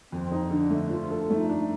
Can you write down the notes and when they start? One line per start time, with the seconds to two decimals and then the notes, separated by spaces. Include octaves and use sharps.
0.12 F2 C4
0.32 D#4
0.51 D3 D4
0.70 A3
0.90 F3 F4
1.11 A4
1.30 A3 D#4
1.49 D4